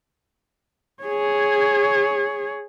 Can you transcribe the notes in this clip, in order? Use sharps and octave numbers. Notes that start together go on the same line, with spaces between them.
G#4 C#5